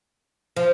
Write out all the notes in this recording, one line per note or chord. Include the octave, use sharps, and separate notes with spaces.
F3